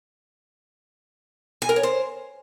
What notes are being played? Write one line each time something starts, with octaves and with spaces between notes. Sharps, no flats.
G#5
A#4
C#5
C5